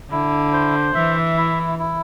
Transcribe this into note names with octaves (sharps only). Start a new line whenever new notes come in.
D3 E4
C5
E3 E5
E4
E4